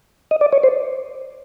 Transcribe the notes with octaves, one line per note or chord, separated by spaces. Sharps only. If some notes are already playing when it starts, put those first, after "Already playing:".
D#5
D5
C#5
C5